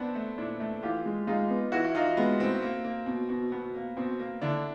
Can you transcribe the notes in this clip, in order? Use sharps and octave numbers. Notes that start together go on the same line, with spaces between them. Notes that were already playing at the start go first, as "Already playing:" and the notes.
Already playing: B3 C4 D4
A3
A#2 D4 E4
A3
E3 F4 G4
G#3
G#3 D#4 F4
B3
E3 E4 F#4
E4
E3 D#4 F4
G#3 B3
A2 C4
A#3
A#3
B2
B2
B2 B3
A#3
B2 C4
A#3
D3 D4 E4